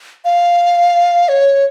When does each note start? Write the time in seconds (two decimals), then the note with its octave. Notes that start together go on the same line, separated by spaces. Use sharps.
0.25 F5
1.29 C#5